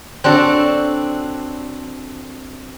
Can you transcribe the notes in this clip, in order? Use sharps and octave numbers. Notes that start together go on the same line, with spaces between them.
C4 D4 F#4 A4